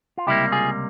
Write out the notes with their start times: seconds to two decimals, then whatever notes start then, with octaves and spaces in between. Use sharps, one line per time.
0.18 F4
0.27 C#2 C3 G3 A#3 E4 G4
0.52 F4 G#4